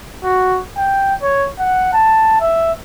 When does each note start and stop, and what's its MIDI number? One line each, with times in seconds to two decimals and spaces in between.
0.24 0.59 66
0.77 1.15 79
1.22 1.46 73
1.59 1.89 78
1.93 2.40 81
2.41 2.73 76